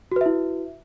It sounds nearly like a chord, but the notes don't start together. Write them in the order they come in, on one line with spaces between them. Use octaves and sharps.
F#4 B4 E5 E4